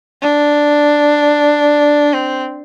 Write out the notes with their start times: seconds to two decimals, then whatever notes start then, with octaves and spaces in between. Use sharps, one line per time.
0.21 D4
2.13 C4